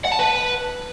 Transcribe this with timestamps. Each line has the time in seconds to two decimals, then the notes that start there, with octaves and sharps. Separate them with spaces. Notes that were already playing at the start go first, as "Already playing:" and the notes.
0.05 F#5
0.12 A5
0.19 B4